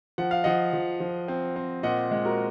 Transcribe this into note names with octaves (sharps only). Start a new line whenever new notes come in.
F3 F#5
F5
F3 D#5 F#5
F3
F3
C4
C4
A#2 D#5 F#5
G#3
F#4 A#4